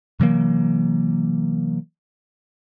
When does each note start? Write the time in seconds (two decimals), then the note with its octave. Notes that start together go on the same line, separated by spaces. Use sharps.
0.20 C3 E3 F#3 A#3